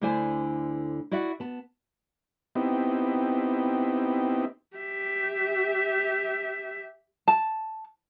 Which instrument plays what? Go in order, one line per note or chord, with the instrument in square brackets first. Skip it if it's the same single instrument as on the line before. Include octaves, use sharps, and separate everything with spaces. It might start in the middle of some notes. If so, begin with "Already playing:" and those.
[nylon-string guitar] D2 D3 E4 C5 D5 G#5
E4 F#4 D5 E5 F#5
B3 A5
[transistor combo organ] B3 C4 D#4 E4 G4
[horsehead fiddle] G4 E5
[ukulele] A5